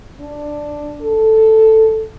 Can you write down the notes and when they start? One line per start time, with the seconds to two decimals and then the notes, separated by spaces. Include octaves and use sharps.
0.20 D4
1.01 A4